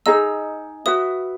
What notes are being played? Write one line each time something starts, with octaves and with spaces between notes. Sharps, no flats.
D#4 G#4 D#5 A#5 E6
F#4 B4 E5 D#6